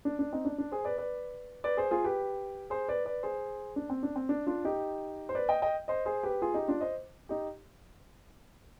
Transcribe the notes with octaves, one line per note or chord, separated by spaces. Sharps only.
D4
D4
C4 D#4
D4
D4
G#4 C5
B4 D5
B4 D5
B4 D5
G#4 C5
F4 G#4
G4 B4
G#4 C5
B4 D5
B4 D5
G#4 C5
D4
C4
D4
C4
D4
D4 F4
D#4 G4
C5
B4 D5
D#5 G5
D#5 G5
C5 D#5
G#4 C5
G4 B4
F4 G#4
D#4 G4
D4 F4
C5 D#5
D#4 G4